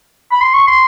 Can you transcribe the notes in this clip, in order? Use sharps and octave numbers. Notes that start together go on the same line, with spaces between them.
B5
C6
C#6
C6